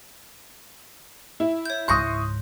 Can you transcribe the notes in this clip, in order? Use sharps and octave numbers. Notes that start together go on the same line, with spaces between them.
E4
C#5 G6
C#2 G#2 C6 C#6 D#6 F#6 G6 A#6